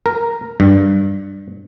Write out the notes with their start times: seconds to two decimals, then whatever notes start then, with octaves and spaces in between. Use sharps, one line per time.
0.06 A#4
0.60 G2